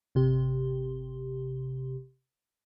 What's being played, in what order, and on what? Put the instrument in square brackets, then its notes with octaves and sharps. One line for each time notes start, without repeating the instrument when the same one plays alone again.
[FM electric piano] G1 C3 G4